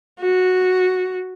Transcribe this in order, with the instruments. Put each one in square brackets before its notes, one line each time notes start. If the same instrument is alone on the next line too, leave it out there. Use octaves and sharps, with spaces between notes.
[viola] F#4